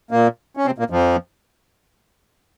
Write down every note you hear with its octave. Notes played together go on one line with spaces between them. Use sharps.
A#2 A#3
C#4
C3 C4
A#2 A#3
F2 F3